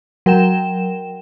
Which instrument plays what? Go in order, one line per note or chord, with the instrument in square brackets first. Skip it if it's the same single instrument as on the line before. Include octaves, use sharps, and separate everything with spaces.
[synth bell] F#3 A#4 G5 E7